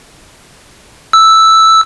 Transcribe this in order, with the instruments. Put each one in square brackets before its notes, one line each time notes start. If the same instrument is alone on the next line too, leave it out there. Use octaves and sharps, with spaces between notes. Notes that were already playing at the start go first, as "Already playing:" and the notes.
[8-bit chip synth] E6